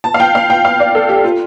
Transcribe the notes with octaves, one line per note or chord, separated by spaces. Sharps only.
A5
F5
G5
F5
G5
F5
D5
A4
G4
F4